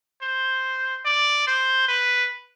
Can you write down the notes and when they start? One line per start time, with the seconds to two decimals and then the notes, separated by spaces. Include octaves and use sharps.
0.22 C5
1.05 D5
1.47 C5
1.88 B4